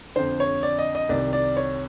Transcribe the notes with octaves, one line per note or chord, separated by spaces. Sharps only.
F2 D3 C5
C#5
D5
D#5
D#5
C2 C3 D#3 D5
D5
C#5